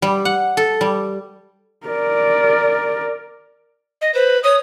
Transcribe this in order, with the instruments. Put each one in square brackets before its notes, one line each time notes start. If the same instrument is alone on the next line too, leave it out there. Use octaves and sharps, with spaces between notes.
[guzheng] G3
F#5
A4
G3
[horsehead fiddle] A#4 D5
[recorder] D#5
[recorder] B4 [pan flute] C5
[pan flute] C#5 [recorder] D#6